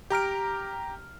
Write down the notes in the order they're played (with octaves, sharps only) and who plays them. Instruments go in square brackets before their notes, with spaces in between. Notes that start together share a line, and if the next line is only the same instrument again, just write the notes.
[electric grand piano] G4 A#5 F6 D7